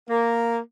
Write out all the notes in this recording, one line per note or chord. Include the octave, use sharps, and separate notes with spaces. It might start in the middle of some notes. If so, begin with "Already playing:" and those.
A#3